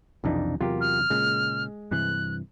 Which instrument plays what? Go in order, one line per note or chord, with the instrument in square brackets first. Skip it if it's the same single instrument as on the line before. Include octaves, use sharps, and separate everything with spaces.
[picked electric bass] B1 C3 E3 [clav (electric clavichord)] F2 D4 D#4
[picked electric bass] E2 C3 F#3 [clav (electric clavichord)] F4 G4 A#4
[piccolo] F6
[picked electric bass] A#2 C#3 [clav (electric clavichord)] G#3
[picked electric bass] G2 C3 E3 [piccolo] F#6